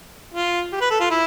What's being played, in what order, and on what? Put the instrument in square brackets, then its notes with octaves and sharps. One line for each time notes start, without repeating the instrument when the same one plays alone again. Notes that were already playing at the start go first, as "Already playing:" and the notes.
[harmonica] F4
G4
B4
A4
F4
E4